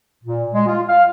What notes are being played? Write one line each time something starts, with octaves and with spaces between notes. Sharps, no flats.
A#2
G#3
F4
F5